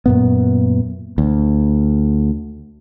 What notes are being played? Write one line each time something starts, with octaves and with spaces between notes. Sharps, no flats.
F#2 A#2 B3
D2